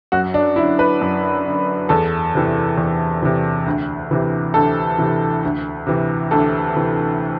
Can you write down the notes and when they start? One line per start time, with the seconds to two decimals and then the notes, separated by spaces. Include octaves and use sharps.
0.12 F#2 F#4
0.34 D4
0.56 D3 E4
0.79 B4
1.01 F#2
1.46 D3
1.89 E2 A4
2.34 C3 E3
2.77 E2
3.23 C3 E3
3.66 D2
4.11 C3 E3
4.54 D2 A4
4.98 C3 E3
5.43 D2
5.87 C3 E3
6.31 D2 A4
6.75 C3 E3